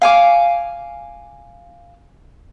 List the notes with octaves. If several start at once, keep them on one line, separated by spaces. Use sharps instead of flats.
F5 G#5 D6